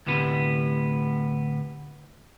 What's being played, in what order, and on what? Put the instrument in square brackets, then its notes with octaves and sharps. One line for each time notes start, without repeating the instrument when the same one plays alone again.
[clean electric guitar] D2 A2 C3 B3